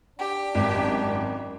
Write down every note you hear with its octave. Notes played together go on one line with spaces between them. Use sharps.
D4 G4
G#1 F#2